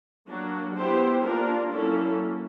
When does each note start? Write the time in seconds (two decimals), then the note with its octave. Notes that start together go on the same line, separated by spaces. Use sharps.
0.27 F#3 A#3 D4 F#4
0.75 B3 E4 G4 C5
1.23 A#3 D4 F4 A#4
1.71 F#3 A#3 C#4 E4 A4